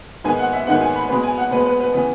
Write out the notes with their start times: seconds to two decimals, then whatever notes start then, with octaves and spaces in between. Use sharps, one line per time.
0.24 G#2 D#3 G#3 B3 G#5
0.39 F#5
0.53 E5
0.67 G#2 D#3 G#3 B3 F#5
0.81 G#5
0.95 B5
1.09 B2 G#3 B3 B5
1.23 G#5
1.38 F#5
1.51 B2 G#3 B3 B4
1.66 B4
1.80 B4
1.94 C#3 E3 B3